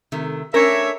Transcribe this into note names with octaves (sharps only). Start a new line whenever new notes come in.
C3 D#3 A3
A3 C#4 D4 A#4 C#5 E5